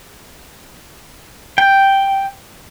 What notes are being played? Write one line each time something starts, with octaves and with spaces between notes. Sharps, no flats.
G5